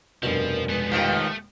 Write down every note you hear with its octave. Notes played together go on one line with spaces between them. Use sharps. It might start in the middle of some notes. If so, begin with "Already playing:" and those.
F1 G2 B2 F3 A#4 B4
F3 G#3 B3 B4 D#6
D#2 D#3 F3 A3